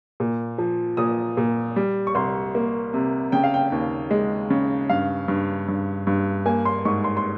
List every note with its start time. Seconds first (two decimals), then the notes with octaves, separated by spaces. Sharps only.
0.20 A#2
0.58 F3
0.97 A#2 D#6
1.37 A#2
1.76 G3
2.07 C#6
2.15 C2 C6
2.55 A#3
2.94 C3
3.32 C#3 G5
3.44 F5
3.54 G5
3.72 D#2
4.11 G#3
4.50 C#3
4.89 G2 F5
5.28 G2
5.68 G2
6.07 G2
6.46 A#3 G#5
6.65 C6
6.85 G#2 C#6
7.04 C6
7.17 C6